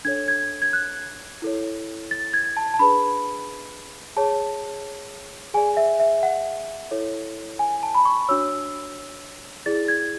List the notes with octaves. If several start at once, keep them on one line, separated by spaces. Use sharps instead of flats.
D4 A4 C#5 G#6
G#6
G#6
F#6
E4 A4 C#5
A6
G#6
A5
A5
D4 G#4 B4 B5
G#4 C#5 A5
G#4 D5 G#5
E5
E5
F#5
E4 A4 C#5
G#5
A5
B5
C#6
D4 F#4 C#5 E6
E4 G#4 D5 A6
G#6